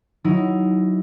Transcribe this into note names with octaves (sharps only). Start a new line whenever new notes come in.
F#3 D#4 E4